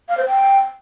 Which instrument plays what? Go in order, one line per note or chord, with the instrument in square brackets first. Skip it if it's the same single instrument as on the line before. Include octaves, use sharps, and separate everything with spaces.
[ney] F5
C5
G5